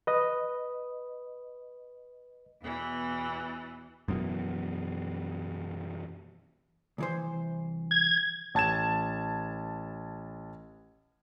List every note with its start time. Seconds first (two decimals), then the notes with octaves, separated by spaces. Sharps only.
0.07 B4 D#5
2.62 E2 B2 E3
4.08 F#2 B2 E3
6.98 C2 E3 C5
7.91 G#6
8.55 A1 A5 G#6 E7